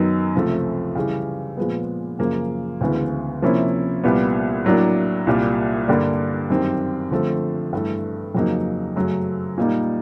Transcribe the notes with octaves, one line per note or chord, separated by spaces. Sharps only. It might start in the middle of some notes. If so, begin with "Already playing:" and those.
Already playing: F#2 D#3 F#3 B3 D#4
C#2 C3 F3 A3
C#3 E3 G3
A#2 F3 G#3 B3
F#2 C#3 F3 A#3
D2 C#3 E3 G#3 B3
C3 F3 A#3 C#4 E4
C2 A#2 G3 B3
A2 F#3 A#3 D4
C2 A#2 G3
G2 D3 G3 A#3 D4
F#2 D#3 G3 C4
D3 F3 A3 C4
G2 E3 A3
F2 C#3 F#3 A#3 D#4
F#2 C#3 F#3 A3
A#2 G3 A#3 D#4